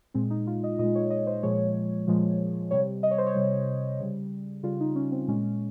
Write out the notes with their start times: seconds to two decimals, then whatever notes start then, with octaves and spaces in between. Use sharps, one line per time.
0.14 A#2 G#3 C4
0.30 D#4
0.47 F4
0.64 D#5
0.79 A#2 D#5
0.83 G#3
0.95 C#5
1.10 D#5
1.27 C5
1.43 A#2 F3 G#3 C#5
2.07 A#2 F3 G#3
2.71 C3 G3 C#5
3.03 D#5
3.11 C#5
3.18 C5
3.26 C#5
3.35 C3 G3
3.99 C#3 G3
4.63 C#3 G3 F4
4.80 D#4
4.95 C#4
5.12 C4
5.28 A#2 G#3 C#4